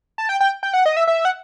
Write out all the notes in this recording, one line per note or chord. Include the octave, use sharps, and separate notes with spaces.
A5
G5
G5
G5
F#5
D#5
E5
E5
F#5